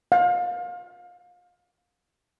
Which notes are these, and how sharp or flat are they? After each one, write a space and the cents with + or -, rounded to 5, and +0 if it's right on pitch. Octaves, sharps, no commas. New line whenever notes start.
F5 +30